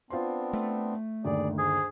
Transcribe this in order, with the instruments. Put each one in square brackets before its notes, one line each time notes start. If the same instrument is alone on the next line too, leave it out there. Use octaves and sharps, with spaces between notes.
[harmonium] B3 C4 D4 [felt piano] F4 C5 C6
[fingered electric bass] A3
[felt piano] G1 D#2 [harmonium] G3 G#4 D5
[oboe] G#4 [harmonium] C5